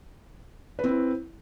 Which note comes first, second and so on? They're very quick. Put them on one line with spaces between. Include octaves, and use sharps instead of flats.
B4 C4 E4